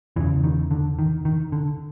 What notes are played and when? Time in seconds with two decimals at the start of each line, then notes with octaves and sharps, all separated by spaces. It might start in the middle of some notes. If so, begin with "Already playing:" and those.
0.16 E2 C#3 E3
0.44 D#3
0.71 D3
0.99 D#3
1.25 D#3
1.52 D3